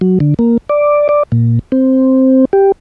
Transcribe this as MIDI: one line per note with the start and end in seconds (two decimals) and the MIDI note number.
0.01 0.19 54
0.20 0.34 50
0.39 0.57 58
0.69 1.08 74
1.09 1.23 74
1.32 1.59 46
1.72 2.45 60
2.53 2.72 67